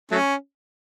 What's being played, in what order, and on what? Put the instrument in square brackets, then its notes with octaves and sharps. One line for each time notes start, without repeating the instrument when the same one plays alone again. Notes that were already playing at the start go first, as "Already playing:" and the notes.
[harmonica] F#3 A3 C#4